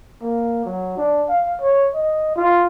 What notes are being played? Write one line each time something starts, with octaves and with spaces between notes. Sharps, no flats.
A#3
F#3
D4
F5
C#5
D#5
F4